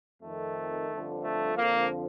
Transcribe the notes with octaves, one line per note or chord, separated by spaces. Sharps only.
F2 D#3 A3
G1 F2 D3 F3
A3
F2 D3 F3 A#3